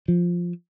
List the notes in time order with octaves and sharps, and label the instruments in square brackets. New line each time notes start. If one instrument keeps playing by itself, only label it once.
[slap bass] F3